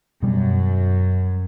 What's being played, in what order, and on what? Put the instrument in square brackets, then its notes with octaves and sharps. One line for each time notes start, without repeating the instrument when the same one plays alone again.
[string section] F#2 [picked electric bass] B2 G3